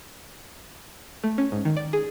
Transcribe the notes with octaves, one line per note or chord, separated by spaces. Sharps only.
A3
C#4
G#2
D#3
D5
G#4